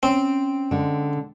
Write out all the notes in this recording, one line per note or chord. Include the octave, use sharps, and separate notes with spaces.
C4 C#4
D3 G#3